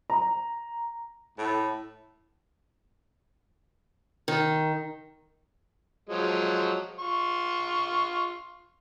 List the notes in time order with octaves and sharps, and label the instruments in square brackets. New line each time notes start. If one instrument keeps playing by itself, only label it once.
[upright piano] A#5
[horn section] A2
[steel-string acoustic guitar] D#3
[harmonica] F3 F#3 G#3
F4 C#6